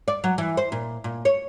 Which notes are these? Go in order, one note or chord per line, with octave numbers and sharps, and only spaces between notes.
D5
F#3
E3
C5
A#2
A#2
C#5